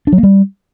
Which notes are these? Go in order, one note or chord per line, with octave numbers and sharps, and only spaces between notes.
D4
F#3
A#3
G3